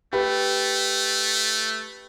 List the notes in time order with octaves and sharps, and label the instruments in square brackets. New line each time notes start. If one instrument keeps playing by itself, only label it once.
[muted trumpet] A3 [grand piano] G4 B4